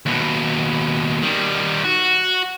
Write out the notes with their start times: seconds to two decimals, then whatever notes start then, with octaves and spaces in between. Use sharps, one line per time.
0.06 D#2 B2
1.22 D#3 G3
1.84 F#4